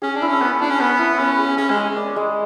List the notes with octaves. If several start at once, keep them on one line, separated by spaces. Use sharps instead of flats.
C#4 G#4
D4
E4
C#4
B3 C#5
D4 E4
C#4
B3 C#5
E4
C#4 C#5
G#4
C#4 G#4
G#3
G#4
D5
G#3